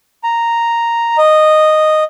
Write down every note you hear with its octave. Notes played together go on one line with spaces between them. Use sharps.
A#5
D#5